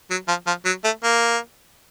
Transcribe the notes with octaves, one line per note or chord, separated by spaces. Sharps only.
F#3
F3
F3
F#3
A3
A#3